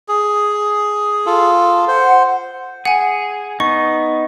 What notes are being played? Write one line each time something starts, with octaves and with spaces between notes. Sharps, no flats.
G#4
F4 A4
C5 F#5
G#4 F#5 G#5
B3 D#4 C#6